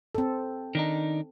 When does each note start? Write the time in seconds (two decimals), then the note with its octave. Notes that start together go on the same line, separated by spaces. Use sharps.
0.15 C4 A4
0.75 D#3 D4 D#4